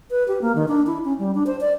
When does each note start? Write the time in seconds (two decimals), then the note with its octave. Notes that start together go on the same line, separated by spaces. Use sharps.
0.11 B4
0.28 G4
0.42 A#3
0.55 D#3
0.68 D4
0.87 E4
1.05 C#4
1.19 G3
1.35 D4
1.47 C5
1.61 D5